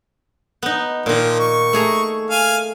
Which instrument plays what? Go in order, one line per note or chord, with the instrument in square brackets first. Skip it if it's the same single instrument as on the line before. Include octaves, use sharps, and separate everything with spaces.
[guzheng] B3 D#4
[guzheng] A#2 D#3 [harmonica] F3
[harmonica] C#6
[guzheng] A3 G#4 A#5
[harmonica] F5 G#5